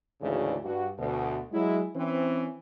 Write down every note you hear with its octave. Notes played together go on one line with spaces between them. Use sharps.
D2 G#2 C#3 E3 F#4 D5
G2 F#4
D2 B2
F#3 G#3 E4
E3 C4 C#4